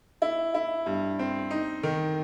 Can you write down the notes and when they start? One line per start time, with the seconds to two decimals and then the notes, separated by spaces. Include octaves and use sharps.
0.22 E4
0.54 E4
0.86 G2
1.19 C4
1.51 D#4
1.83 D#3